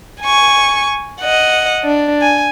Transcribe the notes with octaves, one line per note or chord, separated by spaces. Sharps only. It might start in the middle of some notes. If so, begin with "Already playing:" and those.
G#5 C#6
D#5 F#5
D4
G#5